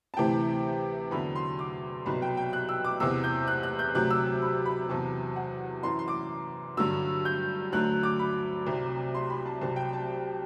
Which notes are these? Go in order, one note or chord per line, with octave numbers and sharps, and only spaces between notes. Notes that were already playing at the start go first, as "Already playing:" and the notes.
A5
D2 C3 E3 G5
E2 D3 F#3 B5
C6
D6
C2 B2 F#3 B5
G5
G5
F#6
E6
D6
E2 C3 E3 E6
G6
F#6
F#6
G6
D2 C3 F#3 F#6
E6
B5
B5
E2 C3 F#3 A5
F#5
F#2 E3 C6
C6
D6
G2 D3 F#3 E6
G6
D2 D3 F#3 F#6
D6
B5
C2 C3 F#3
C6
B5
A5
C2 C3 F#3 A5
G5
A5